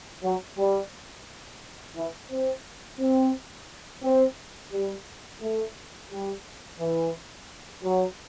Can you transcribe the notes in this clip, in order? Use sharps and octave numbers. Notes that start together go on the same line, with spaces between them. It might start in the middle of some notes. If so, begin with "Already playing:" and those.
F#3
G3
E3
C4
C4
C4
G3
A3
G3
E3
F#3